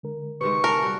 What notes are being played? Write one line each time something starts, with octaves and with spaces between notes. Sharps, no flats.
D3 G#3 A#4
C3 D#3 G#3 B4 C#6
A3 A#4 F5 G#5 A5
G3 F#4